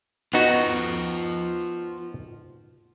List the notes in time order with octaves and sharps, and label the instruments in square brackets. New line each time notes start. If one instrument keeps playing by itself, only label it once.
[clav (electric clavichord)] B3 D#4 F#4 [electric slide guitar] F4 C5 D#5